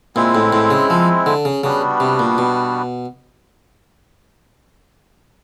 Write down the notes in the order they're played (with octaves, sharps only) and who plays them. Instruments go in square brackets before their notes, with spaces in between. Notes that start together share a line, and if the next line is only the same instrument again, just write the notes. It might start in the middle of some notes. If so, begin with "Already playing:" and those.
[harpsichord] A#2 [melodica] G#3 C4 E4
[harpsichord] A2
A2
C#3
F3
D3
C#3
[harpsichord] C#3 [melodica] G3 B3 D4 F#4
[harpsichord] C3
A#2
B2